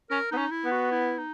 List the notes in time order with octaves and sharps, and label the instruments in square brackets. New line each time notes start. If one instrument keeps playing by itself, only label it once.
[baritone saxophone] C#4 [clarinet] A#4
[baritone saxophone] B3 [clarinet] D#4
[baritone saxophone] C#4
[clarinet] E4
[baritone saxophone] B3
[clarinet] F#4
E4
D#4